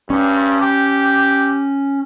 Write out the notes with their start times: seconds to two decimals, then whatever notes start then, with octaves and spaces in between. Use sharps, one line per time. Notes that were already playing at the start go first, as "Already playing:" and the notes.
0.10 G2 C#4
0.61 G4